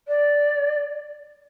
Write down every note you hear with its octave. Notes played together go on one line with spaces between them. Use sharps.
D5